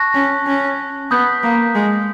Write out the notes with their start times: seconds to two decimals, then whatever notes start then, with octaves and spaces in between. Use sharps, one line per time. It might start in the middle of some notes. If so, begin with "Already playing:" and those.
Already playing: A5 C#6 F#6 A#6
0.14 C#4
0.47 C#4
1.11 B3 D#6 G6 B6
1.43 A#3
1.75 G#3